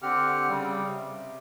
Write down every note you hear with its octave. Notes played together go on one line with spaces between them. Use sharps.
D3 C4 G4 F#5 F6
C#3 G3
C3